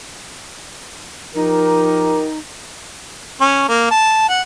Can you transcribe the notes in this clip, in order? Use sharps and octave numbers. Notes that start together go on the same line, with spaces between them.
F3 D#4 G4 A#4
C#4
A#3
A5
F#5